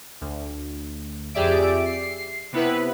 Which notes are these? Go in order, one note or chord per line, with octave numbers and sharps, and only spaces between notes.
D2
F2 G4 G#4 D5 E5 D7
C7
C3 B3 E4 B4